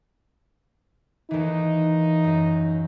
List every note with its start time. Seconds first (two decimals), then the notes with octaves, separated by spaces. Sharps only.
1.31 D#2 E3 D#4
2.24 F#2